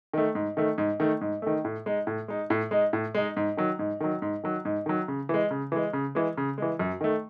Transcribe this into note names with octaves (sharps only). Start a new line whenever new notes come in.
D#3 A3
G#2
D#3 A3
G#2
D#3 A3
G#2
D#3 A3
A2
G#3 D#4
A2
G#3 D#4
A2
G#3 D#4
A2
G#3 D#4
G#2
D#3 F#3
G#2
D#3 F#3
G#2
D#3 F#3
G#2
D#3 F#3
C#3
E3 G#3
C#3
E3 G#3
C#3
E3 G#3
C#3
E3 G#3
F#2
D#3 A3